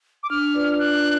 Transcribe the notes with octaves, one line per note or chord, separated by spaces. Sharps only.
D6
D4 F6
F4 B4 D5
D4 F#6
F4